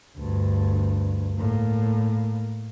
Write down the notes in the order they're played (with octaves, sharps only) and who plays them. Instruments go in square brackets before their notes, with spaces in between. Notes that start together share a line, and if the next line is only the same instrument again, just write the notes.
[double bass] D2 G2
A2 A#3